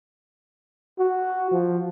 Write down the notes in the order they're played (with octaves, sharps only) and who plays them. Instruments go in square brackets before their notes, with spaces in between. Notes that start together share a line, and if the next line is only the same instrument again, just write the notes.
[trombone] F#4
F3